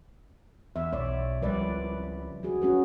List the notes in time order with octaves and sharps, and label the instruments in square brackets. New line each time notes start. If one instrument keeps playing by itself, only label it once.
[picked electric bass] E2 [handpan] E5
[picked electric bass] B1 [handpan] C#5 D5
[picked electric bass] C#2 G3 [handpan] F3 B4 D5
[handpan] F#3 F#4 G#4
C#4 F#4 B4